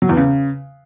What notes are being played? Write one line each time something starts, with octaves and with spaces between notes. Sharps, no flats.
F#3
E2
C#3